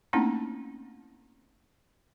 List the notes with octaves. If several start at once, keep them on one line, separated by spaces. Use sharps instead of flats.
A3 A#3 C4 C#4 D#4 E4